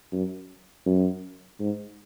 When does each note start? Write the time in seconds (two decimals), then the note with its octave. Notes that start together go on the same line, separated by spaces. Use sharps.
0.12 F#2
0.86 F#2
1.60 G#2